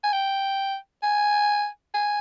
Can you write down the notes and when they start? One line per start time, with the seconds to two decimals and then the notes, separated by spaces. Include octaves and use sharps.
0.03 G#5
0.12 G5
1.03 G#5
1.94 G#5